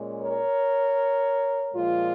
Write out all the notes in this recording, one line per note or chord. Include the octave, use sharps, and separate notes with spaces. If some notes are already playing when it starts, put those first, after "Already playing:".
Already playing: A#2 G#3 C#4
A#4 C#5
A#2 F3 G#3 F4